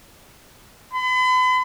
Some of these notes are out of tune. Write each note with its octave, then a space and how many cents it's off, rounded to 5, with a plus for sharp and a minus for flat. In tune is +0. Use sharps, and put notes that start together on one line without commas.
B5 +40